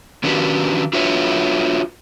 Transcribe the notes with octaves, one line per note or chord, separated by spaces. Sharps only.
D#3 C#4 D4 F#4 G4 B4
D4 F4 F#4 B4 C#5 E5